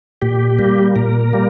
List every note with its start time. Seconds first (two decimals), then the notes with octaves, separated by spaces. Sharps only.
0.22 A#2 G4
0.59 G3 A#3
0.96 A#2 A#4
1.33 G3 A#3